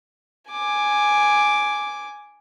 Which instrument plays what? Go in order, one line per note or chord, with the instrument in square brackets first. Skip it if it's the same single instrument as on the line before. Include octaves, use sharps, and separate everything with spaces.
[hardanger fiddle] G#5 D6